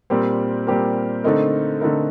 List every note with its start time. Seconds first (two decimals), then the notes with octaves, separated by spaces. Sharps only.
0.10 A#2 G3 C4 G4 A#4
0.67 A#2 G3 C4 G4 A#4
1.24 D3 A3 C4 D#4 A#4
1.81 D3 A3 C4 D#4 A#4